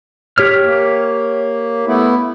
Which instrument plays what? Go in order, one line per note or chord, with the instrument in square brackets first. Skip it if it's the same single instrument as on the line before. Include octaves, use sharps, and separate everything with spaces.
[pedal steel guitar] G4 C#5 F6
[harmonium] A#3
A3 B3 E4